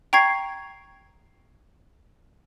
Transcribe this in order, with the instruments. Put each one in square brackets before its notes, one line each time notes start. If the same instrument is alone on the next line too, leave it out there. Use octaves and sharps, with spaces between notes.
[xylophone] G5 A#5 C#6 G#6 C7